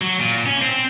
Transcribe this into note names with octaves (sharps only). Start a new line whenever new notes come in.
F#3
A#2
C#4
C4